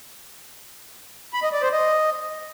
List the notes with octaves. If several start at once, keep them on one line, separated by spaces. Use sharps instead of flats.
B5
D#5
D5
C5
D#5